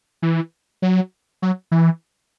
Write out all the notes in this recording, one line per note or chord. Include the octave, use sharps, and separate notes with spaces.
E3
F#3
F#3
E3